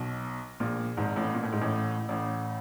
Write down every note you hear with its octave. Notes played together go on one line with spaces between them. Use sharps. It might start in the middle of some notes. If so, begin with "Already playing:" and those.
Already playing: B1 B2
A#1 A#2
G#1 G#2
A1 A2
A#2
A2
G#2
A1 A2
A1 A2